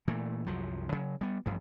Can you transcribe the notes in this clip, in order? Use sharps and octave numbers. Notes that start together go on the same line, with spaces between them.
A#2 E3 A3
C2 F#2 F3 F#3
C#3 F#3
G3 B3
A1 G2 F3